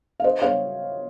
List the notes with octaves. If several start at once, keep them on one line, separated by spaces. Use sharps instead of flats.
F5
C5 D#5
C#5 F5